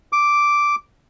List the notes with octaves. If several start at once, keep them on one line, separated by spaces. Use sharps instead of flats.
D6